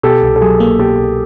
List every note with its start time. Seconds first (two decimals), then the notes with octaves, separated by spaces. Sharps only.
0.03 B2 G4 A4
0.23 C2
0.36 A4
0.41 F#3 G#4
0.60 A#3
0.79 B2 G4 A4
0.98 C2